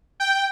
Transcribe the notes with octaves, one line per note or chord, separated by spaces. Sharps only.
G5